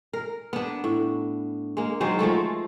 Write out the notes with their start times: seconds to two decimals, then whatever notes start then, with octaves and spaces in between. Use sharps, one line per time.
0.13 A#4
0.53 B3 D4
0.84 A2
1.77 G#3 A#3
2.00 D#3 F#3 G#3 C5
2.19 F3 G#3 A3 A4